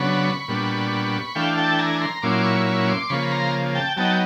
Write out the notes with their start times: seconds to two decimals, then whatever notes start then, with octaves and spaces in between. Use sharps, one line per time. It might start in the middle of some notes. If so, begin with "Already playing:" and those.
Already playing: C#3 F#3 B3 D4 B5 C#6
0.48 A#2 G3 B3 D4
1.35 E3 A3 D4 F5 G5
1.57 G5 A5
1.79 G#5 A#5
2.01 A#5 C6
2.22 A#2 F#3 A#3 C#4 E4 C6 D6
2.44 B5 C#6
2.66 B5 C#6
2.88 C6 D6
3.10 C#3 F3 A#3 B5 C#6
3.27 C#6
3.32 A#5 C6
3.75 G5 A5
3.97 F#3 B3 D#4 G5 A5